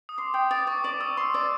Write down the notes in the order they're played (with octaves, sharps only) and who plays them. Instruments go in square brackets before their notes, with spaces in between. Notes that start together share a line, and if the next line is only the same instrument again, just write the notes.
[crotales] D#6
[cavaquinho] C6 [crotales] D6
[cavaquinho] G5 [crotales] D#6
[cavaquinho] D5 [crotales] D#6
[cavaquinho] D5 [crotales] C#6
[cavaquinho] D5 [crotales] D6
[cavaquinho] D#6 [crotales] E6
[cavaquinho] C6 [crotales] E6
[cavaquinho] D5